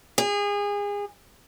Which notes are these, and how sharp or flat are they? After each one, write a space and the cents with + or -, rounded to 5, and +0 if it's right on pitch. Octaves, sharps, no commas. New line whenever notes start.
G#4 -30